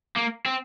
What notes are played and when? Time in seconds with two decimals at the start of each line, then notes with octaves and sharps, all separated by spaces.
0.16 A#3
0.46 C4